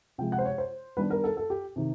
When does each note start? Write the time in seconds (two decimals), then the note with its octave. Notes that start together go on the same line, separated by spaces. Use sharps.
0.18 C3 F3 G#3 G5
0.32 F#5
0.39 C5
0.45 C#5
0.58 C5
0.97 D#3 G3 B3 D4 B4
1.10 A#4
1.24 A4
1.37 A4
1.50 G4
1.76 C3 D#3